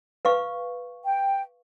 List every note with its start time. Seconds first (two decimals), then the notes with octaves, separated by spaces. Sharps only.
0.25 B4 F5 C#6
1.05 G5